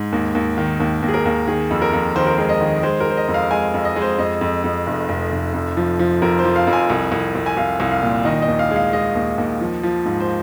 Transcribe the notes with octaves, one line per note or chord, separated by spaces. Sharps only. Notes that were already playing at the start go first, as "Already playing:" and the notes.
Already playing: G#2
D#2
D#2
D#3
D#2
D#2
G#4
A#4
D#2
D#3 G#4
F2
A#4
F2
D#3 C5
A#4
G#3 C5
D#5
D#3
G#3 C5
A#4
G#3 C5
D#5
F2
F5
G#3 G#5
F2
D#5
G#3
C5
F2 D#5
F2
F2
F1
F1
F1
F2
F3
F3
F2 A#4
C5
F3
F5
F2
G#5
C2
C2
C2
G#5
C2 F5
C2
F5
A#2
D#3 D#5
D#5
D#2
F5
G#3
F5
G#3 D#5
D#2
D#2
F3
F3
G#2
C5